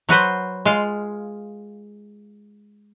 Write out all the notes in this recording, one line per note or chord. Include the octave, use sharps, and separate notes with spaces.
F#3 F#4 B4 C5
G#3 F4 F5